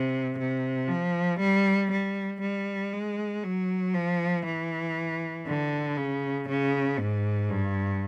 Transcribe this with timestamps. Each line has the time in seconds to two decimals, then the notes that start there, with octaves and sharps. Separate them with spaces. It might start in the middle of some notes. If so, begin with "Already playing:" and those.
Already playing: C3
0.38 C3
0.88 F3
1.39 G3
1.91 G3
2.41 G3
2.93 G#3
3.43 F#3
3.94 F3
4.45 E3
5.47 D3
5.97 C#3
6.49 C#3
6.99 G#2
7.49 G2